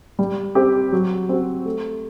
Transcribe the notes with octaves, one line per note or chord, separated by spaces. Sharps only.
G3
C4 G4
F#3
C4 F#4
A3